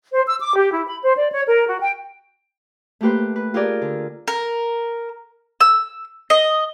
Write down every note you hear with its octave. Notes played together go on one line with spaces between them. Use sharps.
C5
E6
D6
G4
E4
B5
C5
D5
C#5
A#4
F#4
G5
A3 A#3 G4 B4 C5
B4
F4 G4 G#4 A#4 D5
D3
A#4
E6
D#5